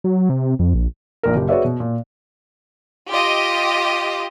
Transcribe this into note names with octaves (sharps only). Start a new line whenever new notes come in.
F#3
C3
F2
A#1
A#1 A#2 A#4
F#1 G4
F#4 G#4 B4 C#5 D5 E5
B2
A#2
F4 G4 D#5